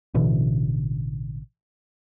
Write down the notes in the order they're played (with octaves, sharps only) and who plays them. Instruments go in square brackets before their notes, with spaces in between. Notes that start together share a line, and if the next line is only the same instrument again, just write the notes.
[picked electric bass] A1 B2 D3 E3